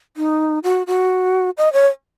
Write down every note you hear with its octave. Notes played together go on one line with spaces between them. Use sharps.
D#4
F#4
F#4
D#5
C#5